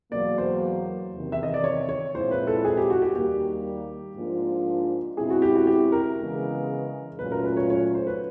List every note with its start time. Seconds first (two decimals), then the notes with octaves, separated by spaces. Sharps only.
0.12 E2 B2 F#3 A#3 D5
0.38 C5
1.13 E2 C3 D#3
1.32 E5
1.43 D#5
1.54 D5
1.64 C#5
1.89 C#5
2.14 A#2 F3 G#3 C4 E4 C5
2.31 B4
2.47 A4
2.65 G#4
2.77 G4
2.90 F#4
3.02 G4
3.15 D#2 D#3 G3 A#3 G4
4.16 G#2 F3 A#3 D4 F4
5.17 B2 G#3 C4 E4 G#4
5.30 F#4
5.42 G4
5.56 F#4
5.67 G4
5.92 A#4
6.18 C#3 E3 G#3 B3
7.19 A#2 F#3 A3 C#4 F4 B4
7.32 A#4
7.44 B4
7.57 C#5
7.70 C#5
7.95 C5
8.07 B4